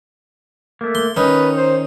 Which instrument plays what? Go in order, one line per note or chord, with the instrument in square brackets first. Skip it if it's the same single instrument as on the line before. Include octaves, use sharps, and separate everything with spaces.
[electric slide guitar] A3 A#3
[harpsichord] C6
[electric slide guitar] D#3 [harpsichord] C#4 D#4 [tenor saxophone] B4
[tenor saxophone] C5